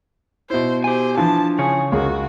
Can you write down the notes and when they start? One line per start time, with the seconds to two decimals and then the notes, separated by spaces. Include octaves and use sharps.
0.50 B2 E4 C5
0.84 G4 C5 G#5
1.17 E3 F3 D4 A5
1.59 C#3 G#4 C#5
1.92 C#2 F#4 G#4 A#4